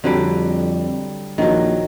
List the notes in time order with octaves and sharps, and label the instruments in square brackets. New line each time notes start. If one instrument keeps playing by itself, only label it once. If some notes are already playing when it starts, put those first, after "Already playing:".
[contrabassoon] F2 [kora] D3 F#3 G3
[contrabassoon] A#1 [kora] D#3 F#3